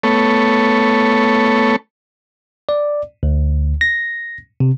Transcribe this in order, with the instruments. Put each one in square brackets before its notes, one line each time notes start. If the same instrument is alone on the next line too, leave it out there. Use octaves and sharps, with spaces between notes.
[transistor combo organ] A3 B3 A4 C#5
[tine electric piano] D5
D2
A#6
C3